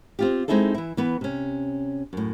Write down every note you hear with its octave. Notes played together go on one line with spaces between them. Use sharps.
C4 F4 G4
G#3 C4 D#4 E4 G#4 A4
E3 E4
E3 B3 B4
C3 C#4
F#2 A2